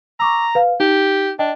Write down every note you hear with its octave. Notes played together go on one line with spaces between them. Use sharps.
A#5 C#6 D6 E6
B4 F5
D#4 G4
D4 D#5 G5